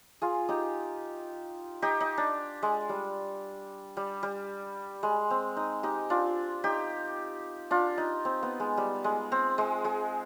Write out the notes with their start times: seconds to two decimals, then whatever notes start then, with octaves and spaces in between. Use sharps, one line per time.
0.22 F4 G#4
0.49 D#4 G4
1.82 D#4 G4
2.00 D#4
2.17 D4
2.62 G#3
2.89 G3
3.97 G3
4.23 G3
5.03 G#3
5.30 C4
5.57 D#4
5.83 D#4 G4
6.10 D4 F4
6.64 D#4 G4
7.71 D4 F4
7.98 D#4
8.25 C4
8.43 B3
8.60 G#3
8.77 G3
9.04 G#3
9.32 C4
9.58 G#3
9.85 G#3